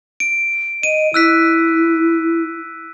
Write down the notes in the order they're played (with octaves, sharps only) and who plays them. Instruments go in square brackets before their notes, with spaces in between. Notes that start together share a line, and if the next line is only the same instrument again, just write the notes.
[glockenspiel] D7
[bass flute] D#5 [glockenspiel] D#7
[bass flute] E4 [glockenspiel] E6 F#6 B6